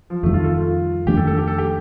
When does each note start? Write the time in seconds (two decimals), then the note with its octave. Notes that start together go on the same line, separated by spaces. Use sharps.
0.10 F3
0.23 F2 D#3 G3 A3
0.34 F4
0.44 A4
0.54 F4
1.07 F2 D#3 A3 D4 G4
1.17 A4
1.27 A4
1.37 G4
1.47 A4
1.58 G4